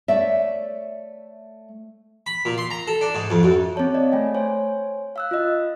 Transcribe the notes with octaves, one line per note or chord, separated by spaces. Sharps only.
A3 C#5 D5 E5
B5
A#2
C6
A#5
A4
D4
G#2
F2
F#2
C4 G#4 C#5 A5
D5 D#5 F5
A3 G5 G#5
C5 C#5 G#5
F5 E6 F#6
F4 D#5